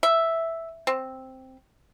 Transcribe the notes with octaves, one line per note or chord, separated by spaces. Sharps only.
E5
C4